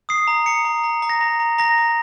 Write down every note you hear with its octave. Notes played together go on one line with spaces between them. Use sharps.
D#6 C7
A#5
A#5 C#7
A#5
A#5
A#5
A#6
A#5
A#5
A#5 A#6
A#5